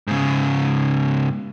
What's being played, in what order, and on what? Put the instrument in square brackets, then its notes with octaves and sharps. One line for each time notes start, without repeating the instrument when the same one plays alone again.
[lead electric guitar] G#2 C#3